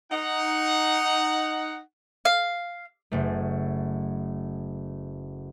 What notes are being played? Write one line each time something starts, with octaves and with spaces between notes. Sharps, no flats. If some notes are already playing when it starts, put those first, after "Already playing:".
D#4 F#5
F5
F#1 A3